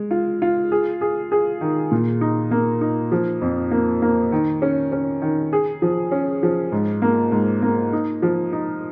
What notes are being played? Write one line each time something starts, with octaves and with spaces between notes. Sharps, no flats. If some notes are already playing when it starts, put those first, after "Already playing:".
Already playing: G#3
F4
F4
G#4
G#4
G#4
D#3
A#2
D#4
A#3
D#4
F3
F2
A#3
A#3
D#3
C#4
C#4
D#3
G#4
F3
C#4
F3
G#2
A#3
G#2
A#3
D#4
F3
D#4